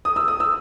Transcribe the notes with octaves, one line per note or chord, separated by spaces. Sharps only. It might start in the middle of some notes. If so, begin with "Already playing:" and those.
D#6
E6
D#6
E6